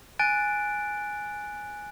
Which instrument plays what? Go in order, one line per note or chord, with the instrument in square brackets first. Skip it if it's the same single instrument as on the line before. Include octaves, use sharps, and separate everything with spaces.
[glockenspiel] G#5 F#6 A6 D7